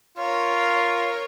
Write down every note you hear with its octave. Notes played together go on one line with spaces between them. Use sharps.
F4 A#4 C#5